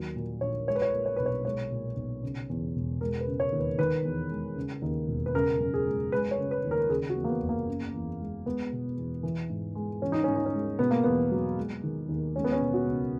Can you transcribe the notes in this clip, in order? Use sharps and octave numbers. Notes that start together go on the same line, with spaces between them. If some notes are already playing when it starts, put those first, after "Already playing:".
Already playing: D#2 F#3
A#2
A#1 C#5
G#3 C#5
B4
C#5
A#2
C#5
B1 B4
C#5
G#3 C#5
A#2
B1
C#3
E2
E1
G#3 A#4
B4
C#3
C#5
D#2
B4
D#3 B4
E2
G#3
C#3
D#2
E1
B4
C#3 A#4
F#2
G#4
G#3
G#3 B4
C#5
C#3
B4
D#2
A#4
C#3 G#4
F#4
E2
A#3
B3
F#1
A#3
C#3
E2
G#3
G#3 B3
B2
E2
E3
G#2
G#3
E3 C#4
D#4
G#2 C#4
D#4
C#4
G#3
B2 B3
A#3
E2 B3
F#3
G#3
D#3
D#2
G#3 C#4
B3
C#4
B2
F#4
C#2